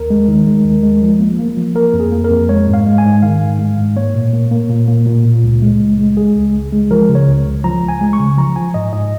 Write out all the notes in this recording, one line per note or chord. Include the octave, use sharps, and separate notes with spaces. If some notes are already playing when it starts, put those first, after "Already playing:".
Already playing: D#2 A#4
G#3
D#3
G#3
D#2
G#3
F3
A#3
A#3
F3
A#3 A#4
F2
G#4
A#3
A#4
F2
G#3 C#5
G#2
F5
G#3
G#5
G#2
D#3 F5
G#2
G#3
G#2
A#3 C#5
A#2
A#3
A#3
A#2
A#3
A#2
A#2
C#2
G#3
C#2
G#3
G#3 G#4
C#2
C#2
G#3
F3 A#4
C#3
C#5
C#2
C#2
F3 A#5
C#2
G#5
G#3
C#6
C#3
F3 A#5
F3 G#5
G#2 D#5
G#2 D#5